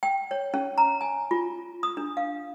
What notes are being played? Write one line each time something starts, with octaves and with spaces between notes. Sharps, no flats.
G5
C#5
C#4
A#5
G#5
F4
D#6
D4
F5